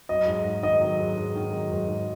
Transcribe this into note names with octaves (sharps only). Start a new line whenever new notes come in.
F#3 D#5
G#2
G#2
D#3 D#5
F#3
G#2
G#2
D#3
F#3
G#2
G#2